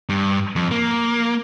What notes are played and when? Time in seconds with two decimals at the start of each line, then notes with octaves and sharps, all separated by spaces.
0.09 G2
0.56 F2
0.71 A#3